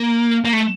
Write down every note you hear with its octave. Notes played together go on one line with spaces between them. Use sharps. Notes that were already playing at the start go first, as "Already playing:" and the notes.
Already playing: A#3
A#3
A3